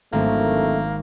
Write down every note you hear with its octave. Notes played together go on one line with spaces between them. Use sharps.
D1 G#1 A3 A#3